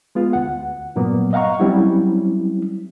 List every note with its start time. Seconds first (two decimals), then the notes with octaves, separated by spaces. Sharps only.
0.15 G#3 B3 F4
0.33 D2 F#5
0.96 G2 A#2 F#3 A#3 B3
1.33 D#5 F5 F#5 A#5 C#6
1.60 F#3 G3 C4 C#4 E4